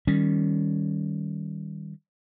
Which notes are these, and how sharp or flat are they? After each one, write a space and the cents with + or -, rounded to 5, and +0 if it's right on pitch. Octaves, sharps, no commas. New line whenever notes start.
D#3 +0 G3 +0 C#4 +0